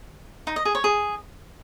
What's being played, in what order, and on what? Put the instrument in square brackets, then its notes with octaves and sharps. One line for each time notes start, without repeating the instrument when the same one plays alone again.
[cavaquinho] D#4
D#5
G#4
C#5
G#4